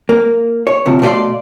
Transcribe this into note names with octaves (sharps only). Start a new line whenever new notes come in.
A#3
C#5
D2 C3 F3
B2 A3 D5 D#5 F5 C6